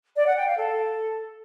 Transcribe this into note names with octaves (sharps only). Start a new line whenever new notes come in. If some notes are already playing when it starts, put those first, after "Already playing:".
D5
F#5
G5
F5
A4